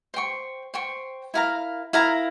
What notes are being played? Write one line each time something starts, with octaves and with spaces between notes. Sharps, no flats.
C5 G5 C#6
C5 G5 C#6
E4 A#4 F5 A#5
E4 A#4 F5 A#5